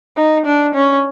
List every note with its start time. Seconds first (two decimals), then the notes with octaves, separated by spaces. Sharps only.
0.17 D#4
0.46 D4
0.75 C#4